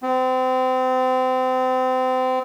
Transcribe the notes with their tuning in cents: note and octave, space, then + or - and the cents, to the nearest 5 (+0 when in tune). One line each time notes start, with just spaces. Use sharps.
C4 -30